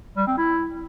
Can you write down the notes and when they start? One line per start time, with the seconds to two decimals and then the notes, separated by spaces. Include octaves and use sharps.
0.17 G3
0.27 C4
0.38 E4